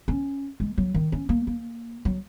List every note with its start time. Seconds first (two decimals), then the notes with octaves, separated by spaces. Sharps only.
0.08 C#4
0.60 G#3
0.78 F#3
0.94 D#3
1.12 C#4
1.29 A#3
1.47 A#3
2.05 F#3